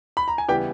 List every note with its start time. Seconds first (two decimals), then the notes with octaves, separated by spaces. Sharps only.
0.17 B5
0.28 A#5
0.38 G#5
0.48 C#3 E3 G3 B3 G4 G5